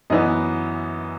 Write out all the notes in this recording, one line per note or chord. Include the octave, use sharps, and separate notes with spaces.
F#2 E3 B3 D#5